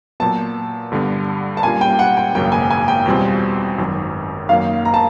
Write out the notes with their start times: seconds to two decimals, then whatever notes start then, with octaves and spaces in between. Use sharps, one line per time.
0.20 A#2 F#3 B3 A5
0.92 G2 D3 G3 B3
1.57 A5
1.63 A#2 G3 A#3 C#4 F4 G#5
1.81 G5
1.99 F#5
2.17 G5
2.35 G#1 F#2 C#3 F#3 A#3 G5
2.52 G#5
2.71 G#5
2.88 G5
3.06 E2 B2 G3 C4 F4
3.78 G#1 F#2 D#3 F#3
4.49 F#2 D#3 F#3 A#3 F5
4.85 A#5
4.94 A5